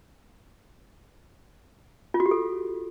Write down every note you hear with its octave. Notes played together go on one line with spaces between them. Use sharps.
F4
F#4
G4
A4